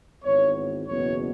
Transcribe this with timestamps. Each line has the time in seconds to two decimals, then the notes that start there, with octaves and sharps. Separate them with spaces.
0.24 G#1 G#2 E3 B3 C#5
0.88 F#1 E2 B2 B3 C#5